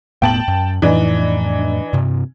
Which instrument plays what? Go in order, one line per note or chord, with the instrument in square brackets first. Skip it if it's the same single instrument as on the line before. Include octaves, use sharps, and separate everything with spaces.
[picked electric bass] E1 A2 B3 [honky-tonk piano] G5 A5 F#7
[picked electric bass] F#2
[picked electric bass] F2 A2 [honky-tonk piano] E3 D4 D#4
[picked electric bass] G2 C3